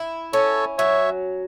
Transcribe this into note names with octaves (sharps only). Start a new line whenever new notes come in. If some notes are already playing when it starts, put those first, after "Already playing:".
Already playing: E4
C#4 A4 C#5
F#3 C#5 E5